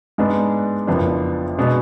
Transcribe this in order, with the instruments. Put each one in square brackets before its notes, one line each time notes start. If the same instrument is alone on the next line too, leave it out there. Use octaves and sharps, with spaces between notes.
[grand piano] G#2 G#3 B3 D4
F#1 F2 F3 B3 D4
B2 G#3 B3 D4